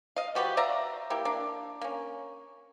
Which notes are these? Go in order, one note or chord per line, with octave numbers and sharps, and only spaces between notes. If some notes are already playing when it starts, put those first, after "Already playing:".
D#5 F5
F3 F#4 G4 B4
D5 E5 F5 A#5
A#3 E4 G4
A#3 D4
A#3 C#4